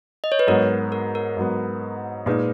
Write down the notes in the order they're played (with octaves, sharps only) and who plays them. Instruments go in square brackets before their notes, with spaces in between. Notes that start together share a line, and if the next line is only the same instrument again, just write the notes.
[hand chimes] D#5
C#5
B4
[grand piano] G#2 F#3 B3 [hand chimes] A#4
[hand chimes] A#4
A#4
[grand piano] G#2 F#3 B3
[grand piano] A#2 G#3 D#4 [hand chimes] B4